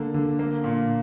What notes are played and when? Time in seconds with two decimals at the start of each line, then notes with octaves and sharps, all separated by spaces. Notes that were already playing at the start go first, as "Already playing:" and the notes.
Already playing: D3 A#3 D4
0.14 D3
0.39 A#3
0.64 A#2